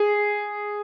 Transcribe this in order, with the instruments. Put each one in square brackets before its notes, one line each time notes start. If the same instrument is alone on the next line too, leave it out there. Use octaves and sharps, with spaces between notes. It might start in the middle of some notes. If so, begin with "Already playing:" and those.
Already playing: [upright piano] G#4